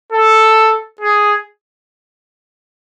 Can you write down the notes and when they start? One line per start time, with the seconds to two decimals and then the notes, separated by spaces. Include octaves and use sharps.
0.12 A4
1.01 G#4